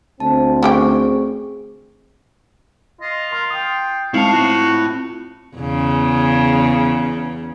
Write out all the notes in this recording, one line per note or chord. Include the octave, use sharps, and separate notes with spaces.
D2 C4 A5
A3 C#4 G4 G#4 G5 C#6
F4 D#5
A#4 C6
G5 D#6
G#3 C4 D#4 E4 F5 A5 C#6
C4 F4 F#4
E2 C#3